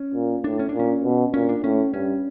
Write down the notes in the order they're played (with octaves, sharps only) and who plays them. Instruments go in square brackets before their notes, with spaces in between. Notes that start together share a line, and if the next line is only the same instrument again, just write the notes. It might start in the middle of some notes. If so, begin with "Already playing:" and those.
Already playing: [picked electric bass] C#4
[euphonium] A#2
[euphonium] A2 [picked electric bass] D4
[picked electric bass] C#4
D4
[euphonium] A#2
[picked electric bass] C#4
[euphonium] B2
[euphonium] A#2 [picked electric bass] C#4
[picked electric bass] D4
[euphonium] A2 [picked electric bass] C#4
[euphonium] G2 [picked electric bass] C#4